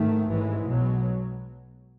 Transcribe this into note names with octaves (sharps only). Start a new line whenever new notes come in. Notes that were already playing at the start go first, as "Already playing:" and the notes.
Already playing: G#2 D#3 A3
A1 G#2 E3 G#3
B1 B2 F#3